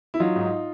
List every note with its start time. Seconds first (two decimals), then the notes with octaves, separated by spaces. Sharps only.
0.14 E4
0.20 F#3 D#4 F4
0.36 G#2